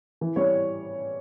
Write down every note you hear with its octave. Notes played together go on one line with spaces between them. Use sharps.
E3
G3 C#5